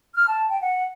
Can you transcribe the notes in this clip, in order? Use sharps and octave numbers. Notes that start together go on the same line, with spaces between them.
F6
A5
G5
F#5